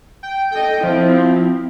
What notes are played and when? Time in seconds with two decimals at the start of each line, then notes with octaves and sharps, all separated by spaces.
0.23 G5
0.52 A4 D#5 G5
0.84 F3 C4 E4